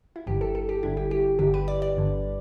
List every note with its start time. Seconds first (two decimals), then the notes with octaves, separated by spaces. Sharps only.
0.16 E4
0.27 G1 G2 D3 G4
0.41 A4
0.55 A4
0.69 G4
0.83 G1 G2 D3 E4
0.97 G4
1.11 G4
1.39 G1 G2 D3 G4
1.54 B4
1.68 D5
1.82 D5
1.96 G1 G2 D3